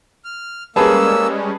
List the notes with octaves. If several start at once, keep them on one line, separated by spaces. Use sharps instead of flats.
F6
G3 G#3 A#3 C#4 G#4 B4 A5 E6